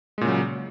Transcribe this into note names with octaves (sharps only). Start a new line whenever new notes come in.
A#2 C#3 F#3 G#3